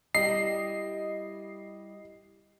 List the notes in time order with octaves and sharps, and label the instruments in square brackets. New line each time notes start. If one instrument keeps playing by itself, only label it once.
[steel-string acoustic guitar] G3 E4 G4 [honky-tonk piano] D#5 [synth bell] C7